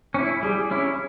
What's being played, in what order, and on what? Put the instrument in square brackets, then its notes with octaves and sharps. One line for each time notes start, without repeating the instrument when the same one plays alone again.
[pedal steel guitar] C#4
E4
[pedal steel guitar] G3 [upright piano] G#4
[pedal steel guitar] C#4 E4